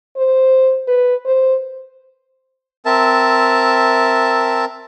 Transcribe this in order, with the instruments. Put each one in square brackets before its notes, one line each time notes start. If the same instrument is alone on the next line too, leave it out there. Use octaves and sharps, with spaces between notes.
[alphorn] C5
B4
C5
[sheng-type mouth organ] C4 A#4 E5 A5